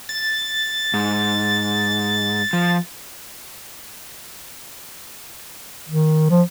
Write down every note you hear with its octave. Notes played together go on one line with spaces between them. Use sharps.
A6
G#2
F3
D#3
F3